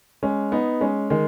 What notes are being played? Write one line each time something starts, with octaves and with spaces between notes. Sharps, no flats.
G#3 C#4
B3 D#4
G#3 C#4
D#3 G#3